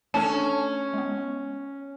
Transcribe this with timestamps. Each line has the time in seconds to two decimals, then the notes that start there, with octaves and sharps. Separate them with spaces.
0.14 A3 C#4 D4 A4 A5
0.93 G#3 B3